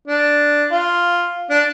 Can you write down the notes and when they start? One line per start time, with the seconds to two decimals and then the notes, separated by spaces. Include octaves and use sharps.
0.08 D4
0.71 F4
1.50 D4